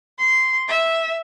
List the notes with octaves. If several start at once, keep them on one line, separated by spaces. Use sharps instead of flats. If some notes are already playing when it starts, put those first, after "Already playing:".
C6
E5